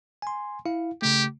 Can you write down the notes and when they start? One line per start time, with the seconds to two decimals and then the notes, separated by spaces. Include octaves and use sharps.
0.22 G#5 C6
0.66 E4 F5
1.02 C#3 A3 G4